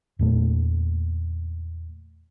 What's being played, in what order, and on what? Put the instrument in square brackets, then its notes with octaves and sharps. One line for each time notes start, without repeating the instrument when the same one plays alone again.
[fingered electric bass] E2 A#2 A3